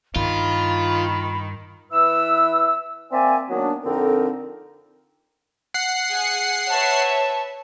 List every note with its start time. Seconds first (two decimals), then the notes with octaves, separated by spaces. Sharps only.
0.16 G2 D#3 F4 B5
1.92 E3 E4 B4 E6
3.12 A#3 C4 D5 E5 G#5
3.49 D#3 F#3 A#3 B3 D4
3.83 F2 D3 C4 D#4 A4 A#4
5.74 F#5 C7
6.10 G#4 C#7
6.69 B4 C#5 E5 A5